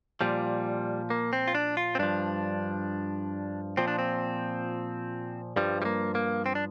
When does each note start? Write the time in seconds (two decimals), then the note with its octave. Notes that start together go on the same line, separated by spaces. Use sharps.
0.21 A#2 F3 G3
1.10 A#3
1.33 C4
1.48 F4
1.55 D4
1.77 F4
1.95 C4
1.99 G2 F3 D4
3.77 A#2 F3 C4
3.88 D4
3.99 C4
5.56 G2 F3 G3
5.82 G3
5.85 A#3
6.15 A#3
6.46 C4
6.55 D4